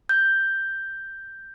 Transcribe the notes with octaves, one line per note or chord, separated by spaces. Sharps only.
G6